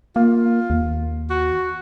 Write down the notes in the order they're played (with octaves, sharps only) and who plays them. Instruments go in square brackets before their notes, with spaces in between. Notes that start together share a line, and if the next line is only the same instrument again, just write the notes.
[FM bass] A#3 [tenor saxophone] F4
[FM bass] D#2
[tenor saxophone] F#4